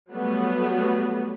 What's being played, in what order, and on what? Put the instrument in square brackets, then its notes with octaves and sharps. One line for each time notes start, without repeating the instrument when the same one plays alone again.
[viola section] F#3 G3 A3 B3